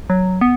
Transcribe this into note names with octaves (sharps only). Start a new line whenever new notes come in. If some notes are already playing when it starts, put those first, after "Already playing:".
F#3
B3